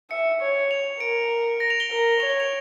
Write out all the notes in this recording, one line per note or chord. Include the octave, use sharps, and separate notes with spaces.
E5 C#7
C#5
F7
A#4 D7
A#6
F7
G7
A#4
C#5 F7
G7
F7